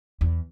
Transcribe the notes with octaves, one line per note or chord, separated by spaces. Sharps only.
E2